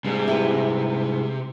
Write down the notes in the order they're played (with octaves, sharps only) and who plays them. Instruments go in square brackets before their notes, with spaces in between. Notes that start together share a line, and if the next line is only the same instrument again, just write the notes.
[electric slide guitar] G#2 G3 G#3 [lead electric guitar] C3
[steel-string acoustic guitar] E4 G4 B4